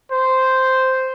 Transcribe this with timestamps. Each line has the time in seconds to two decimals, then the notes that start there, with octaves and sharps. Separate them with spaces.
0.12 C5